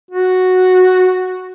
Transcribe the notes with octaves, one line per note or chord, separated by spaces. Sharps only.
F#4